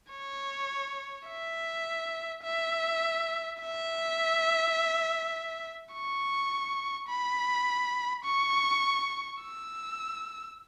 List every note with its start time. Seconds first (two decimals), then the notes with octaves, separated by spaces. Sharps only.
0.11 C#5
1.28 E5
2.43 E5
3.60 E5
5.93 C#6
7.09 B5
8.25 C#6
9.42 E6